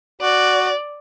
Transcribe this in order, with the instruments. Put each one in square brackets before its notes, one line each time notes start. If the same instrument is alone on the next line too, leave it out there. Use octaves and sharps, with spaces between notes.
[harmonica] F#4 [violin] D5